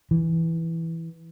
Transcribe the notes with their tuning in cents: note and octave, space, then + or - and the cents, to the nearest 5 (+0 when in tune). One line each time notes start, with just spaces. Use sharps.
E3 -5